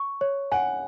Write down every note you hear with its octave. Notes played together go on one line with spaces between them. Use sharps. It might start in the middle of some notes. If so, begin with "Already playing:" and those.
Already playing: C#6
C#5
F#5 G#5